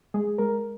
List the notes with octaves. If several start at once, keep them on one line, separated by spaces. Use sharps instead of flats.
G#3 G#4
G#3 A#4